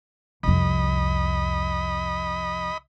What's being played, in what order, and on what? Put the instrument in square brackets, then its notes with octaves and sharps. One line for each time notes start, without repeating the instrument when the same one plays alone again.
[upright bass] C2 F2 [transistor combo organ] D#5 B5